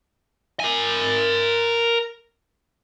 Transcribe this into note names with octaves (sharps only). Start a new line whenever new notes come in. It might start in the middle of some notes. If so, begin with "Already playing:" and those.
A#4 G#5